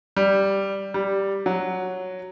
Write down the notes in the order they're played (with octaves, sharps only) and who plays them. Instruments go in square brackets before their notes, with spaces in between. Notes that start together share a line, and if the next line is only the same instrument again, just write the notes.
[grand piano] G3
G3
F#3